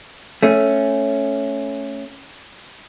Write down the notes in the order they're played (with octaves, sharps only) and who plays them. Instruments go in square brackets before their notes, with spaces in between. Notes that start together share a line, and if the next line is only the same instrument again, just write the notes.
[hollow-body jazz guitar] A3 C#4